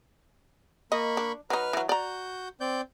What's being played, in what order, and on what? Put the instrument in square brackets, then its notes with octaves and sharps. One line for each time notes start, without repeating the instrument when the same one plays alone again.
[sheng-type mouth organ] A#3 B5 C#6 [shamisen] D#5
[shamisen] D4
[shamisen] F#3 D#4 [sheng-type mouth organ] B4 F6
[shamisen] E3 F#3
[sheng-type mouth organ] F#4 G6 [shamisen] D5 A#5
[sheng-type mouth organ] C4 D5 G6